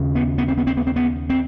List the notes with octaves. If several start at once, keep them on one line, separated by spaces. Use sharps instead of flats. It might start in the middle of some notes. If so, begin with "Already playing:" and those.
Already playing: D#2 C#3
B3
B3
C4
B3
C4
B3
C4
B3
C4